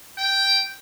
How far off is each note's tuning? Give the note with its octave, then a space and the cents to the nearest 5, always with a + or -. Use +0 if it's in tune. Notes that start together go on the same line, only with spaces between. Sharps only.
G5 -5